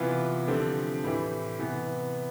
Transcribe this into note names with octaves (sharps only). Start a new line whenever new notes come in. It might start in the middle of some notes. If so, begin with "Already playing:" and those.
Already playing: C3 E3 B3 F4
D3 F3 A3 C4 G4
A2 E3 A3 E4 G4
C3 E3 B3